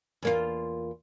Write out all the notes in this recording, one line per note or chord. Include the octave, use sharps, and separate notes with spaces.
E2 A#3 F4